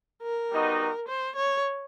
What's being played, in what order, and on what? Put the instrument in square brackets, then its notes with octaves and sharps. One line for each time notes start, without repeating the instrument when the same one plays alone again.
[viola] A#4
[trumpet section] G3 B3 D#4 F#4
[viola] C5
C#5